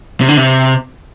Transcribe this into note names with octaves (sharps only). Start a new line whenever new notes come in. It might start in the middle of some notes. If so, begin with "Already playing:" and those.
C3
D3
C3